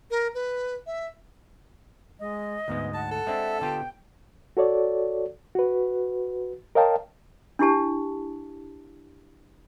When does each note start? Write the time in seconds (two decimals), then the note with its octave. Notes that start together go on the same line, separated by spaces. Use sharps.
0.11 A#4
0.35 B4
0.87 E5
2.20 G#3 D#5
2.68 D2 G#2 G#3 B3
2.94 F#5 A5
3.11 A4
3.27 G#3 C4 D4 E5
3.61 D3 B3 F4 G4 G5
4.57 F#4 A4 C#5 D5
5.55 F#4 B4
6.75 A#4 C#5 D#5 F5 G5 A5
7.59 D4 E4 G4 A5